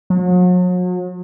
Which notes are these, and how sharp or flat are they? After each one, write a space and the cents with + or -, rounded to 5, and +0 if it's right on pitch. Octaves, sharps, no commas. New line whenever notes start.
F#3 -40